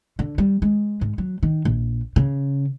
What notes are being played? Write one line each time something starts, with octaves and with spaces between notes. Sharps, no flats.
D3
G3
G#3
G#2
F#3
D#3
A#1
C#3